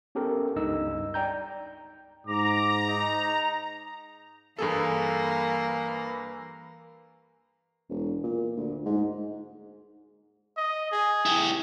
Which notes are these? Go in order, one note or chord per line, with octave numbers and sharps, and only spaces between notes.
B3 C#4 G4 A4 A#4
C#2 G2 D#4 D#5 E6
D5 G5 A#5 G6
G#2 A#5 D6
D#4
G2 E3 A#3 G#4 A4
E1
A#2
D2
G#2
D#5
G#4
E4 G4